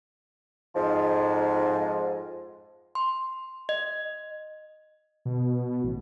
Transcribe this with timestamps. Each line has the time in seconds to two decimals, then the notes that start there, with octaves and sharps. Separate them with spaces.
0.76 F2 G#2 F3
2.95 C6
3.69 D#5
5.25 B2
5.84 A1